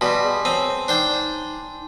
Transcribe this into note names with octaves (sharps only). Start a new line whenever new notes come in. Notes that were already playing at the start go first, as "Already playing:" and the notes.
B2 G3 D5 G#5 A5 C6
G#4
C4 C#5 A5 D#7
D4 D#4 C5 G5